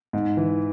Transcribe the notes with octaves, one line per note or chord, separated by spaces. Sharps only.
G#2
E3